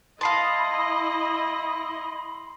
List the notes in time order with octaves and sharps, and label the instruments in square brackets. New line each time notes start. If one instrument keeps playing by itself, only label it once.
[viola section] E4 D#5 [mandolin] F5 A5 [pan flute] B5 [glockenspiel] C6 C7